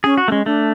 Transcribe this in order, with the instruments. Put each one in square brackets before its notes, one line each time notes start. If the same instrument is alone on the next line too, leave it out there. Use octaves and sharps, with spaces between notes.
[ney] C#4 [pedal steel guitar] G#4
[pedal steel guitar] F#4
[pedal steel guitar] G#3 A3 [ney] C#4
[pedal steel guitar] A3 [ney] D4